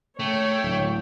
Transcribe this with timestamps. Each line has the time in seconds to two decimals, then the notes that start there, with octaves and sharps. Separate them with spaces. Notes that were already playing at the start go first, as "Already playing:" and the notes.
0.19 A3 C#5 G5
0.64 D1